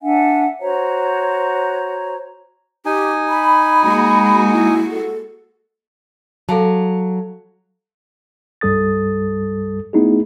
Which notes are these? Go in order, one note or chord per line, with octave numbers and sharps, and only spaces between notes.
D4 E5 F#5 G#5
F#4 C5 C#5 A#5
D#4 G4 G#5
B5
G#3 A#3 F#4
E4
A4
F#3 A4 F5 A5
C2 G2 G3 A4 D#6 A6
A3 B3 D#4 E4 F#4 G#4